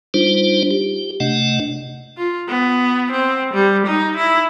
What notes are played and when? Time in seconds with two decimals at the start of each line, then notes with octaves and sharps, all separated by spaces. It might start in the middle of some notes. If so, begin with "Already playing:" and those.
0.14 G3 D4 D#4 F4 C5
0.71 G4
1.20 C3 A3 D4 D#5 F#5
2.17 F4
2.49 B3
3.12 C4
3.54 G3
3.87 D#4
4.16 E4